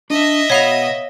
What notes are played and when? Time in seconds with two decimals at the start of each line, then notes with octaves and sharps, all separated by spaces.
0.10 D4 D#5 E5
0.50 B2 C#5 F5 F#5 B5 F7